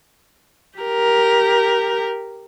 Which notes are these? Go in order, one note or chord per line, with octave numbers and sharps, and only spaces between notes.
G4 A#4